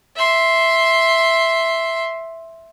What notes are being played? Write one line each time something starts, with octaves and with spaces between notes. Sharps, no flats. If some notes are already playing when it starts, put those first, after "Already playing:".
E5 C6